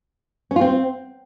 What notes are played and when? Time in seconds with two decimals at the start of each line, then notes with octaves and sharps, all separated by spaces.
0.51 C#4
0.56 F4
0.61 C4